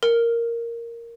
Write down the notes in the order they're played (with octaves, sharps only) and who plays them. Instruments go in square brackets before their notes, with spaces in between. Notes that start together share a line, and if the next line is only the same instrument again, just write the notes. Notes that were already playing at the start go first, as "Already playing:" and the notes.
[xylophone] A#4